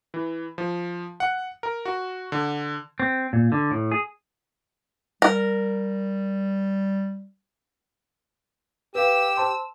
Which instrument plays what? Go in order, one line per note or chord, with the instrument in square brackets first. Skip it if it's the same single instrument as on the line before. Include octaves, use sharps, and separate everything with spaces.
[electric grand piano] E3
F3
F#5
A#4
F#4
D3
[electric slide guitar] C4
A#2
D3
A2
G#4
[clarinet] G3 [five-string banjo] A#4
[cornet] G4 [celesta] B4 F5 [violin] E6
[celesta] C5 A5 C6